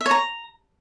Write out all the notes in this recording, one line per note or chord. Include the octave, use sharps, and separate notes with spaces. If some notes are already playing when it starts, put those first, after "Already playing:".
E5
C#5
A#5